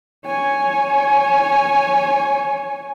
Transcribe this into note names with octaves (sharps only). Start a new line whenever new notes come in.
C#5 G#5